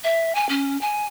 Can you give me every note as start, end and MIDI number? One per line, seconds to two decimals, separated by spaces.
0.03 0.32 76
0.35 0.46 80
0.49 0.79 61
0.81 1.05 80